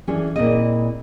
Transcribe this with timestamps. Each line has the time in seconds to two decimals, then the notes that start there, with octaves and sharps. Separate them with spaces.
0.07 E3 C#4 D4 G#4 A4 C#5
0.36 A#2 C4 E4 G#4 D5 D#5